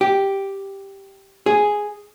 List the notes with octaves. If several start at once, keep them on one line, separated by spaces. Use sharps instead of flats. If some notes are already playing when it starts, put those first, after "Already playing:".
G4
G#4